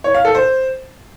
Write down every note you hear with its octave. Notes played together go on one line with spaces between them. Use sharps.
C#5
F5
A4
C5